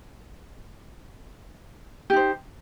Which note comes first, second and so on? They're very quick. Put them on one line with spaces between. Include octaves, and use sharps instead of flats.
G4 D#4 C5